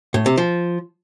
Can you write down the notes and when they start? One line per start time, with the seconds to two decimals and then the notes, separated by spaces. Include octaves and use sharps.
0.14 A2
0.26 C3
0.37 F3